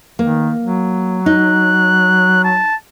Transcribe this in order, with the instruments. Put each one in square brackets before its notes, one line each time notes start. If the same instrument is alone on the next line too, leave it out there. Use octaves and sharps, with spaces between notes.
[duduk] D#3 [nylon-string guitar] A#3
[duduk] F#3
[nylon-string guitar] D#4 [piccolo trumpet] F#6
[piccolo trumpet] A5